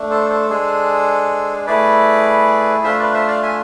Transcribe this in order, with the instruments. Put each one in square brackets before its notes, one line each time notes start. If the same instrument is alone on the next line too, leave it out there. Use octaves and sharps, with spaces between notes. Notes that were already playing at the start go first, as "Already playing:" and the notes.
Already playing: [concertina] A3 D4
A4 C5
A4 C5
G#3 D4 G#4
A3 E4 G#4 B4 D5
A3 D4 F4 C5 E5
B4 D5
C5 E5
D5 F5
E5 G#5